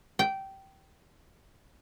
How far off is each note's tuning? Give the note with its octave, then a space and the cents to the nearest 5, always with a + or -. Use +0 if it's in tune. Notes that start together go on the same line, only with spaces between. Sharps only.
G5 -15